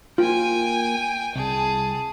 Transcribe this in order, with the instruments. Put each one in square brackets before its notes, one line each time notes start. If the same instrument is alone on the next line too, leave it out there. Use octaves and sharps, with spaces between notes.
[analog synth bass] A#3 [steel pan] F4 [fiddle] G5 G#5
[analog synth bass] C2 [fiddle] G#4 A5